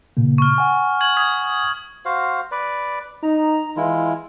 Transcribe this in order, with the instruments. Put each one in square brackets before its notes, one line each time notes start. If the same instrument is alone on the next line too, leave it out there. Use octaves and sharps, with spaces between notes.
[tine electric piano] A#2 C#3 A#3
[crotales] C#6 F6
[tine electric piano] F#5 G#5
[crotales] C#6 G#6 F#7
D#6 G#6
[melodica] F#4 C5 F5
B4 D5
[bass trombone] D#4 [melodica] A#5
[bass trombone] E3 [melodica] G#3 E4 F4